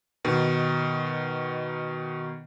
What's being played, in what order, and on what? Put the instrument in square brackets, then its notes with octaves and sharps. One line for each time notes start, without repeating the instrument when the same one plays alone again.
[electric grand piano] B2 D#3